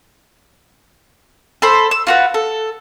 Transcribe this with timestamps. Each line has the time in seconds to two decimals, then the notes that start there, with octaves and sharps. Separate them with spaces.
1.62 A4 C5 B5
1.91 E6
2.07 F4 F#4 B4
2.34 A4